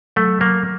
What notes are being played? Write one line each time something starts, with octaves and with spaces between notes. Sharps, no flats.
F#3 A3
F#3 A#3